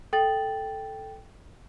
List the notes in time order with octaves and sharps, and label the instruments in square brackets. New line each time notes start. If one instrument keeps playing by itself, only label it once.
[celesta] A4 G5 A6 F#7